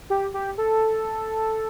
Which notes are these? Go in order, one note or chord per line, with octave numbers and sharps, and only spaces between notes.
G4
G4
A4